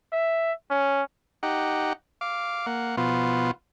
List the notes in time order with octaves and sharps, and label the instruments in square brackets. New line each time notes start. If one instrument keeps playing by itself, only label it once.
[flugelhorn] E5
C#4
[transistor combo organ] D#4 G4 F#5
F5 D6
A#3 F#5
B2 F3 B3 F4